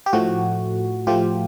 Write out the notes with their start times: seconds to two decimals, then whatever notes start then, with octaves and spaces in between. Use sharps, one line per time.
0.06 G4
0.13 A2 F3 A3 F#4
1.07 A2 F3 A3 F4 G4